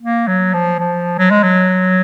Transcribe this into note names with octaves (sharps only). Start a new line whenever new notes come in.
A#3
F#3
F3
F3
F#3
G#3
F#3